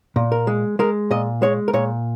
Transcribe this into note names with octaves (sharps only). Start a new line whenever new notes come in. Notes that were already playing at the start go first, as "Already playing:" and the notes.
A#2
A#4
G#3
G#3 A#4
A#2 D#5
G#3 C#5
A#4
A#2 C#5